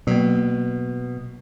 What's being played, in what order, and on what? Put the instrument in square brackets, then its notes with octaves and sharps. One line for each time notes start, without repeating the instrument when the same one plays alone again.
[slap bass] B2 [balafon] F#3 A#3